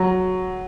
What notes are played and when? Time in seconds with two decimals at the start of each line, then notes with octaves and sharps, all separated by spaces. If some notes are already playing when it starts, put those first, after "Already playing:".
Already playing: F#3